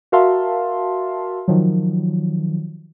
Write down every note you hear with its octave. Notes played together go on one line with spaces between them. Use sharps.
F#4 A#4 E5 F5 A5 C6
D#3 F3 F#3